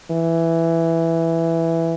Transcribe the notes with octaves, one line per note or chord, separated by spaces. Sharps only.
E3